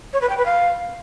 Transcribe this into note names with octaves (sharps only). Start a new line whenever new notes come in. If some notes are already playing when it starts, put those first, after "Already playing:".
C#5
B4
G5
B4
F5